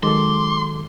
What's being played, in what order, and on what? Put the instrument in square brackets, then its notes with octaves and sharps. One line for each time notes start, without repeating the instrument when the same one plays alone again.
[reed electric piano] D#3 F#3 A4 [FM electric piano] G#3 [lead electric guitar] C6 [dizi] D6